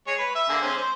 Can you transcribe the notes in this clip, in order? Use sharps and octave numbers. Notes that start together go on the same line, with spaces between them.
G#3 C#5
B4
E5
D3 A#3 G#4
G#3 C4 C#4
C5